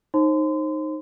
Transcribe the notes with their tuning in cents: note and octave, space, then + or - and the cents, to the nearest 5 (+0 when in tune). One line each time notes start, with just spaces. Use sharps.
D#4 -5 C5 +30 C6 -35